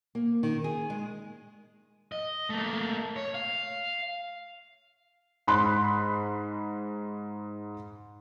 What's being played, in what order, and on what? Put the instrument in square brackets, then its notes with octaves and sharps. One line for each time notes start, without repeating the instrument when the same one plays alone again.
[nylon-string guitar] A#3
D#3
G#4
G#3
[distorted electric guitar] D#5
A3 A#3
C#5
F5
[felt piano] G#2 B5 C6 F#6